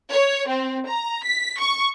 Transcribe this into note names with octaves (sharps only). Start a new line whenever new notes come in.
C#5
C4
A#5
B6
C#6